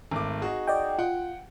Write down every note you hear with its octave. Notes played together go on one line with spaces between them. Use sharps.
G#1 A3 D6
D#4 F#4 G#4
D5 D#5 G5
F4 F#5 G5